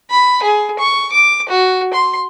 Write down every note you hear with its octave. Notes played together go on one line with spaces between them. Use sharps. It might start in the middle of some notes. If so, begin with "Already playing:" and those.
B5
G#4
C#6
D6
F#4
C6